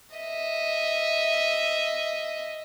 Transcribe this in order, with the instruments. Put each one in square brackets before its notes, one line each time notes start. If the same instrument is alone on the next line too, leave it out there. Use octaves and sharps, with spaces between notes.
[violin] D#5 E5